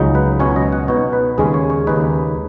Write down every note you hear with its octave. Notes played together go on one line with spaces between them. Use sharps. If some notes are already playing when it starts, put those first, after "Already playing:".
Already playing: C#2 C#3 F#3 D#4
B4
C#2 B2 F#3 C#4 C#5
D#5
F#5
B2 B3 D#4 C#5
B4
D#2 C#3 G#3 C#4 G#4
C#5
C#5
D#2 C#3 G#3 D#4 B4